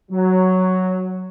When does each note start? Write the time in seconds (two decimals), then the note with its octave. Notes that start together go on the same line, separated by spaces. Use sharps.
0.11 F#3